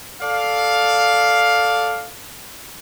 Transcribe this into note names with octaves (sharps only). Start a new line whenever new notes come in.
A4 D5 F5